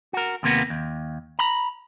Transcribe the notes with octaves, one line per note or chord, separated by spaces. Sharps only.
F#4 A#4
D#2 C3 A#3 B3
D#2
A#5 B5